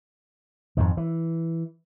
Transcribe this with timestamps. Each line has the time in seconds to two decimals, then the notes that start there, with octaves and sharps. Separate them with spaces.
0.77 F2 G#2 D#3
0.97 E3